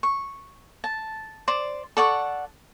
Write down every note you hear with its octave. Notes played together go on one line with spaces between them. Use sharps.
C#6
A5
C5 D5
A4 D5 F#5 C#6